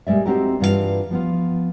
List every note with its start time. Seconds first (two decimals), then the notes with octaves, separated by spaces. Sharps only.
0.07 A#2 G3 G#3 D5 E5
0.25 C4 D#4 F#4 G4 A4 A#4
0.60 G2 E3 F4 F#4 A#4 F5
1.10 F3 B3 F4